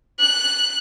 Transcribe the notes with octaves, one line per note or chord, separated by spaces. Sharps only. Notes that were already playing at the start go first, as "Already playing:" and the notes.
F#6